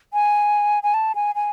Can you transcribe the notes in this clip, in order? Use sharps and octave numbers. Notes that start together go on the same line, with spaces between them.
G#5
G#5
A5
G#5
G#5